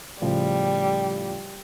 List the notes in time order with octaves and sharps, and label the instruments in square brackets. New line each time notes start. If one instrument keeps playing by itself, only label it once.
[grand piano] A2 C#3 F3 [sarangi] G3